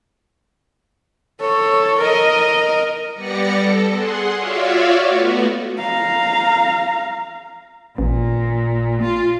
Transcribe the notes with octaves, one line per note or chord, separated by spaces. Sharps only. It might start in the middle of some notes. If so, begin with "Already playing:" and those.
A4 C#5
A#4 D#5
G3 B3 D5 A#6 C#7
A4
G#4 F#5 C6
F4 F#4 C#5 D5 E5 F5
A3 B3 F#4
F5 A#5
A1 A#2
F4